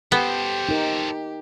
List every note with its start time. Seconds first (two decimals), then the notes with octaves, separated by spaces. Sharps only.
0.12 B3 G4 A4 C5
0.69 D#4 A#4